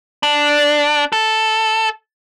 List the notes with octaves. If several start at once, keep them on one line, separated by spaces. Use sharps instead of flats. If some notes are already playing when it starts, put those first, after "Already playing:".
D4
A4